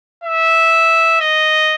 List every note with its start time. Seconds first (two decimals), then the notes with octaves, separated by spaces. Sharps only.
0.24 E5
1.20 D#5